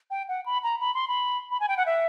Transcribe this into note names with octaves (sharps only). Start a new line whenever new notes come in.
G5
F#5
B5
A#5
B5
C6
B5
B5
G#5
G5
F#5
E5